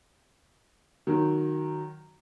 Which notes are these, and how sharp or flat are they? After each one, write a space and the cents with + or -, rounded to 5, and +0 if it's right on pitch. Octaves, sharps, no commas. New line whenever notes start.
D#3 -15 F#3 +0